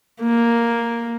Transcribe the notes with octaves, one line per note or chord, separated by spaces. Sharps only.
A#3